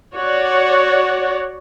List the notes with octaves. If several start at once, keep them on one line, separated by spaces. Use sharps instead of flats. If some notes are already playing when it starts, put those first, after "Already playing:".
F#4 C#5 D5